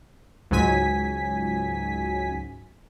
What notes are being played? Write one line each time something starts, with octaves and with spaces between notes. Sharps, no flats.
C#2 G#2 F#3 G#5 B6